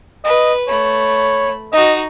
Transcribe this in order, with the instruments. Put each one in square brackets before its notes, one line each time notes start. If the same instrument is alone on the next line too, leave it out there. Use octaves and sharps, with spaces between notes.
[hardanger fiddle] B4 [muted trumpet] D#5
[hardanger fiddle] A3 B5 [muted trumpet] C#5
[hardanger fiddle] D#4 F#4 [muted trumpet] D#5